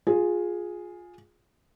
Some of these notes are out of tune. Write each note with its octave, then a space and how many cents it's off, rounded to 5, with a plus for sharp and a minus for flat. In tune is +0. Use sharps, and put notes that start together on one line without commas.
F4 +20 G#4 +0